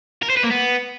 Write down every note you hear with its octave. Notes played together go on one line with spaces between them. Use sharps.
A#4
C5
B4
A#3
B3